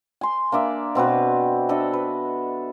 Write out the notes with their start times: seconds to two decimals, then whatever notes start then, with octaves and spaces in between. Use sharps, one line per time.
0.21 G#5 C6
0.52 A#3 D4 D5 E5
0.95 B2 C4 F#4 B4
1.69 D4 A4 D#5 E5
1.93 B4